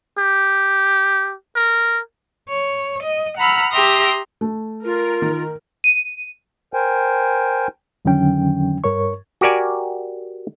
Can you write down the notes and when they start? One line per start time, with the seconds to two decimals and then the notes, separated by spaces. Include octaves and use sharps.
0.19 G4
1.56 A#4
2.50 C#5
3.03 D#5
3.38 F#5 A#5 B5 E6 F6
3.72 G4 E5 A#5 C6 D#6
4.41 A3
4.85 F4 A#4
5.22 D#3
5.84 D#7
6.74 A#4 C5 G5 G#5
8.05 F2 D3 D#3 F#3 C#4 G5
8.84 G2 A#4 C#5 C#6
9.41 F#4 G4 A#4 D5 G#5